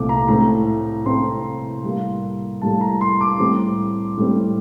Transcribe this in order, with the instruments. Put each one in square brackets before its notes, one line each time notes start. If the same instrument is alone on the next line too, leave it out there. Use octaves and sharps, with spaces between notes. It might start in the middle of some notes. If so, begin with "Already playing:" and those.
Already playing: [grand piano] C2 A#2 A3 C4 D6
A#5
A2 A3 C4 A#5
A2 A3 C4 C6
A2 G3 A#3
A2 G3 A#3 A5
A#5
C6
D6
A2 G3 C4
A2 G3 C4